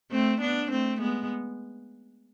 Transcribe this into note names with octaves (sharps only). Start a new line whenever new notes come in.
A3 C4
B3 D4
A3 C4
G#3 B3